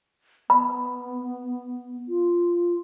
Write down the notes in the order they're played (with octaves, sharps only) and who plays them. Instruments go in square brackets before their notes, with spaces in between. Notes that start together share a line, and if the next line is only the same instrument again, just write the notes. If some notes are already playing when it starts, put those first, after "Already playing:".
[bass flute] B3 [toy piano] B5
[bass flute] F4